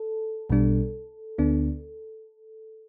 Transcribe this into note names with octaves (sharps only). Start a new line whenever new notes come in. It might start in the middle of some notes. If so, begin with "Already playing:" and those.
Already playing: A4
B1 B2 G3 D4
D2 D3 B3 D4